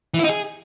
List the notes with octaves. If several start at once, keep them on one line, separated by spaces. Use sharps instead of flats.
E3
E4
D#4
G#4